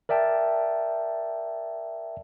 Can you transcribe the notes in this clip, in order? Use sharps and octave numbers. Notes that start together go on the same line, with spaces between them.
A#4 D5 E5 G5 A5